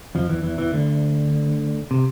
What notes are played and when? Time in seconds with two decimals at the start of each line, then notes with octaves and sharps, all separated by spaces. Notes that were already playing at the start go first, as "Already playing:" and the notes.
0.15 F2 F3
0.29 E2 E3
0.43 E2 E3
0.58 E2 E3
0.73 D2 D3
1.91 C3